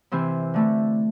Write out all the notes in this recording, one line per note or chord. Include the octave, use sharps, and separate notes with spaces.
C3 E3 C4 E4
D3 A3 E4